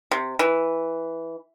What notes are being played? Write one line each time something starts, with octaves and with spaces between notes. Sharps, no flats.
C3
E3